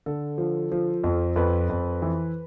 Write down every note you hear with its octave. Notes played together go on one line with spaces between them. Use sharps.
D3 A4
F3
F3
F2
F2 B4
F2
E3